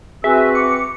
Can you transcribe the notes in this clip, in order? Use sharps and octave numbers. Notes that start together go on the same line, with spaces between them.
C4 F#4 G#4 B4 E5 G#5 E6
D6 C#7